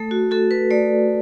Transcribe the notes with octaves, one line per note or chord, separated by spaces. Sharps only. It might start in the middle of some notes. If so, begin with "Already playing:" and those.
Already playing: A3 A4
F#4
F#4 A4
B4
A3 D5